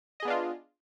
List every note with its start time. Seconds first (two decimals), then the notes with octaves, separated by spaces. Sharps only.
0.20 D#5
0.23 G#4
0.25 B3
0.28 D4
0.30 F4